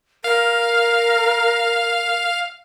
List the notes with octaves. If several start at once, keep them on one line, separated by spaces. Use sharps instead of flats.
A#4 F5